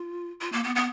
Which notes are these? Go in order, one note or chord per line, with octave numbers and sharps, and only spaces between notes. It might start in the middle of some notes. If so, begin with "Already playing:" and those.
Already playing: F4
F4
A#3
B3
B3